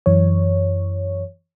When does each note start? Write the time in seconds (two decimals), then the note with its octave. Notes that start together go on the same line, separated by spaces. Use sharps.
0.06 F#2 E3 C#5